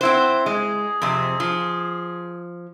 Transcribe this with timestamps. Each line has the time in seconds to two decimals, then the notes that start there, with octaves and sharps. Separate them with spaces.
0.01 C4 E4 C5 F#5
0.46 G#3 G#4
1.02 F2 C3
1.40 F3